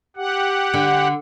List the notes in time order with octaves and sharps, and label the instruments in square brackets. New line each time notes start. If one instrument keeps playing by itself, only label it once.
[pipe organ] G4 F#5
[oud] D3